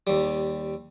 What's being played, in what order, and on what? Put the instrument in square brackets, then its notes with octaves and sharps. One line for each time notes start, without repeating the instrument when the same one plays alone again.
[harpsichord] D#2 G3